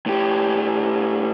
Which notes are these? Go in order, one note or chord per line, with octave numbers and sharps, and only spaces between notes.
A2 G4